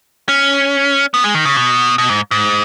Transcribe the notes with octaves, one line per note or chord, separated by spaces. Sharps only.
C#4
B3
G#3
D#3
C#3
B2
B2
G#2
G#2